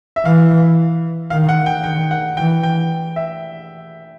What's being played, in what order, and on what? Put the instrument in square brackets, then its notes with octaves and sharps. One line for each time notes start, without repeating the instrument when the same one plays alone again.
[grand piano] E5
[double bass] E3 [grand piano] F5
[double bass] D#3 [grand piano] F5
[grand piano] F#5
G5
[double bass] D#3 [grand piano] G5
[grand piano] F#5
[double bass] E3 [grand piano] G5
[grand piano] G5
E5